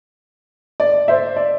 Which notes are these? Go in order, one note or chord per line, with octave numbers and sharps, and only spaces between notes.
D5
C5 E5
D5